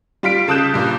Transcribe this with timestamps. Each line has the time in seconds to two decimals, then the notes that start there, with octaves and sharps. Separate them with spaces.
0.23 G3 F4 B6 D7
0.48 C#3 A5 D#6 F#6 G6 E7
0.74 G2 A#2